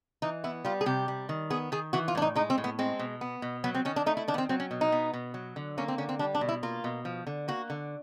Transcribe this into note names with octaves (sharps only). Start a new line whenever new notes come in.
E3 D#4
B3 E4
G3 F4
G#4
C3 G4
G3
D#3
B3 G#4
D#3 G#4
E3 F#4
F4
A2 D4
D#4
G#3 D#4
C4
A2
B3
G#3 C4
B2
B3
B2
F#3 B3
C4
D#3 C#4
D4
A3 D#4
E4
D#3 D4
B3
C4
F#3 C4
C#4
B2
D#4
B3
B2
F#3
D3
A#3 C#4
C4
D3 C#4
C4
G3 D4
D4
B2
E4
A#3 F4
B2
F3
D3
A#3 F#4
D3